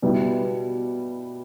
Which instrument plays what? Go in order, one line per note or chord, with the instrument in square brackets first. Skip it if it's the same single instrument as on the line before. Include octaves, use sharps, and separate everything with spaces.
[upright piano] B2 G3 B3 E4